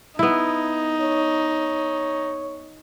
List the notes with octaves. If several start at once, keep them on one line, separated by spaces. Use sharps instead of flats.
B3 D#4 E4
C#5